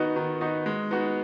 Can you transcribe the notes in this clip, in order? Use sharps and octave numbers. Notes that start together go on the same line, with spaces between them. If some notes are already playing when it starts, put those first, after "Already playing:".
Already playing: D#3 B3 D#4 F#4 D#5
D#3
B3 D#4 F#4 D#5
G#3
B3 D#4 F#4